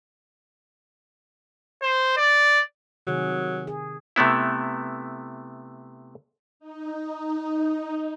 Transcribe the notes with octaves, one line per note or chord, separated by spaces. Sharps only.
C5
D5
C3 D#3 F#3 G#4
G#4
C3 A3 B3 E4
D#4
D#4